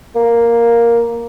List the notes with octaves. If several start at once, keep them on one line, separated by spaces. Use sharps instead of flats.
A#3